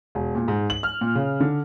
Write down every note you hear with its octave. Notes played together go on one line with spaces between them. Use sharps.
E1
A#2
G#2
F#7
F6
A#2
C#3
D3